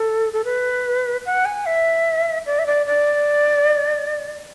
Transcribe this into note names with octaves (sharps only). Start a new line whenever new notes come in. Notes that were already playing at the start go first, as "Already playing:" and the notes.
Already playing: A4
A4
B4
F#5
G#5
E5
D5
E5
D5
D5